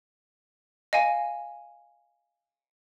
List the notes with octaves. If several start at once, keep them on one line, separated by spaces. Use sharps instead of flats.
D#5 F5 G#5